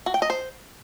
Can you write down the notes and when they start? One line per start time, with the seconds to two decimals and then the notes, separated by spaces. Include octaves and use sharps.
0.06 F#4
0.14 G5
0.22 D#5
0.30 C5